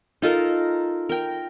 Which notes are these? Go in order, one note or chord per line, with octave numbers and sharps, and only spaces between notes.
D#4 F4 A4 A#4
A#4 G5